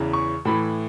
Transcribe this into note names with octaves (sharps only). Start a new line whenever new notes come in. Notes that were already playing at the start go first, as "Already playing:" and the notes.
Already playing: E2 C#3 E3
C#6
A2 E3 B5